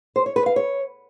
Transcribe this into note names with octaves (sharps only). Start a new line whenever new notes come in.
C5
C#5
B4
F5
C#5